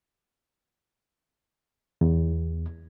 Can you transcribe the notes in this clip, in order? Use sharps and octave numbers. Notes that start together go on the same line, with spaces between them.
E2